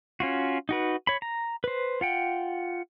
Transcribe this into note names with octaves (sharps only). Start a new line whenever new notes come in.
C#4 F4 F#4
D#4 F#4 B4
C#5 B5
A#5
B4 C5
F4 F#5 G5